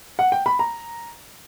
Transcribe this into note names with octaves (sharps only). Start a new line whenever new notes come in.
F#5
G5
B5
A#5